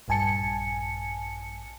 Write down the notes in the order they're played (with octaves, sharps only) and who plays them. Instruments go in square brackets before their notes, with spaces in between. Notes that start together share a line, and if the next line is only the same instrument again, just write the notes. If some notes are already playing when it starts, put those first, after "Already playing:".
[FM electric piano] A#1 G2 G#5 A5 C#7